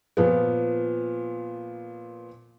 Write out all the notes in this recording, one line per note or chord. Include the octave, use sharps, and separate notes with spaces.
A#2 F3 B3